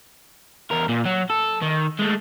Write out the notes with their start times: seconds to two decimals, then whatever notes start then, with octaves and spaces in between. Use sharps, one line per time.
0.71 E2 A#4
0.89 A#2
1.06 F#3
1.30 A4
1.62 D#3
1.99 G#3 A3